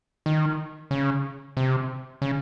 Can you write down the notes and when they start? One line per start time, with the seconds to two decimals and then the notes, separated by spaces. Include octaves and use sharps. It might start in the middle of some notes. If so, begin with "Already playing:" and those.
0.26 D#3
0.91 C#3
1.57 C3
2.22 C#3